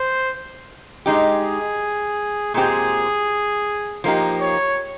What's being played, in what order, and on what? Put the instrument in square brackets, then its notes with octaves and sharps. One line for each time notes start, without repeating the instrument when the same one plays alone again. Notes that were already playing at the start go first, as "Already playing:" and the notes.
Already playing: [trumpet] C5
[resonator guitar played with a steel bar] G#3 D#4 G4 [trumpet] G#4
[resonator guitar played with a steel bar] A#2 G#3 C4 G4 [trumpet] G#4
[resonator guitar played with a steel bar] F3 A#3 D#4 G4
[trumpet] C#5